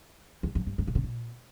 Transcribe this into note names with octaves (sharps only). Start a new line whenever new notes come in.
E2
F2
G2
G2
A#2
C3
A#2